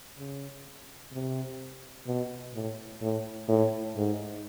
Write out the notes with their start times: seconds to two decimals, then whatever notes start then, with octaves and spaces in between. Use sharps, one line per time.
0.18 C#3
1.13 C3
2.07 B2
2.54 A2
3.02 A2
3.49 A2
3.96 G#2